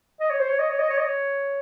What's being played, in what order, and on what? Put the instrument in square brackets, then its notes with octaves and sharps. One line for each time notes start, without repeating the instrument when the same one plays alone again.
[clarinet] D#5
C#5
C5
C#5
D#5
C#5
D#5
C#5
D#5
C#5